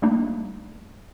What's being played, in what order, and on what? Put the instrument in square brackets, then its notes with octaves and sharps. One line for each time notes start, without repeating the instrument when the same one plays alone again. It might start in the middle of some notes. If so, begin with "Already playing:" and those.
[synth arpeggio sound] G3 A3 A#3 D4 D#4